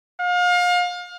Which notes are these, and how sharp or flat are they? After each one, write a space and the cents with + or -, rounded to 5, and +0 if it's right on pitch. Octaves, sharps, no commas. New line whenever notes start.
F5 +35